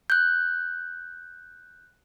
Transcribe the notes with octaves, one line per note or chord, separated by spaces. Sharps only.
F#6 G6